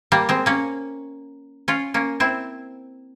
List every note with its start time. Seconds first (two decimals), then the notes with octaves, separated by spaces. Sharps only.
0.12 G3 A#3
0.29 G#3 C4
0.46 A#3 C#4
1.68 C#4 F4
1.94 A#3 C#4
2.20 C4 E4